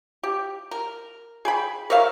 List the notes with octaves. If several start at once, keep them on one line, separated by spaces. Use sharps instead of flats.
G4
A#4
G#4 G5 B5
A#4 C#5 E5 F5